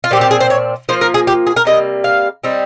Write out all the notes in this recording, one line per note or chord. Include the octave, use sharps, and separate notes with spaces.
F4
A#2 F3 C4 G4
G4
G#4
C5
C#5
F3 A#3 F4 C5
A#4
G#4
G4
G#4
A#4
C3 G3 A#3 D#5
F5
G3 C4 D#4